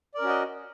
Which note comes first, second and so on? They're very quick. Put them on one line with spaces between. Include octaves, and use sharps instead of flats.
D5 A#4 C#4 F#4 D#5